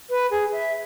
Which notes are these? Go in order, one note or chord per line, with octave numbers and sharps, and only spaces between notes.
B4
G#4
E5